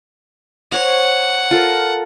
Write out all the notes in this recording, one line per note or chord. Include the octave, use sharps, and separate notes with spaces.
C5 C#5 F#5 A#5
F4 A4 A#4